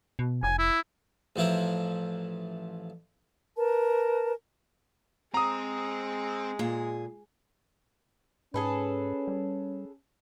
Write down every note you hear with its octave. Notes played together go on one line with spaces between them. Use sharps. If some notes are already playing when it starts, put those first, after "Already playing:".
B2
F1 G#5
E4
A1 F3 E4 A#4
A#4 B4 A5
G#3 C4 A#5 D#6
A#2 G#4
G#2 C#4 G#4 A4 B4
G3